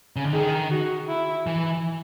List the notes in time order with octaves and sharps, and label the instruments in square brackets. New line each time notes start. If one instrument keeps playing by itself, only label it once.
[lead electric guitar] C#3
D3
[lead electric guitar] D#3 [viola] G#4
[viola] F#4
E4
[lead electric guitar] E3